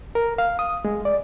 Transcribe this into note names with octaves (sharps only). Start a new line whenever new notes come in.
A#4
F5
D#6
G#3
D5